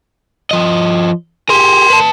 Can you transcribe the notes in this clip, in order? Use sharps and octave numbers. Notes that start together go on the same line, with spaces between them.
F3 D#5
G4 G#4 A#4 C6
B4 A5